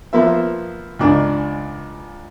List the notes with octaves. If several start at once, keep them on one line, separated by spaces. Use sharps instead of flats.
F3 A#3 B3 F4 E5
C#2 G#2 D4